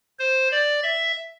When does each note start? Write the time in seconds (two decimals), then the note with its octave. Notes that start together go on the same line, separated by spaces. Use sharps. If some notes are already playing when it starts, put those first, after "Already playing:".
0.19 C5
0.51 D5
0.83 E5